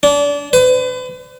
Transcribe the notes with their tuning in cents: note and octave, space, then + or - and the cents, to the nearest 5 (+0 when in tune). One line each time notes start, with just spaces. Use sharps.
D4 -30
B4 +40